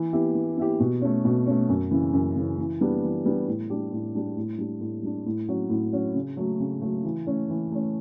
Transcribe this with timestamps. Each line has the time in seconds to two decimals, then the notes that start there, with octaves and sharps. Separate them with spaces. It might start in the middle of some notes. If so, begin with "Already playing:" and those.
Already playing: E3
0.13 B3 E4 G4
0.35 E3
0.57 B3 E4 G4
0.80 B2
1.02 A3 C#4
1.25 B2
1.47 A3 C#4
1.69 F#2
1.91 C#3 E3
2.13 F#2
2.36 C#3 E3
2.58 E3
2.81 G3 B3 D4
3.03 E3
3.25 G3 B3 D4
3.47 A2
3.70 G3 D4 G4
3.92 A2
4.15 G3 D4 G4
4.37 A2
4.58 G3 D4
4.81 A2
5.03 G3 D4
5.26 A2
5.48 F#3 C#4 F#4
5.70 A2
5.93 F#3 C#4 F#4
6.15 C#3
6.37 F#3 A3
6.60 C#3
6.81 F#3 A3
7.04 E3
7.27 A3 C#4
7.50 E3
7.72 A3 C#4